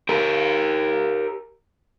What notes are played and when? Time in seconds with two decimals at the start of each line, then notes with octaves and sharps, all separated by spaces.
0.09 G4 A#4